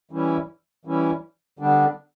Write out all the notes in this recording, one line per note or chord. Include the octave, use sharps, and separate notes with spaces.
E3 G3 C#4 E4
E3 G3 C#4 E4
D3 G3 B3 D4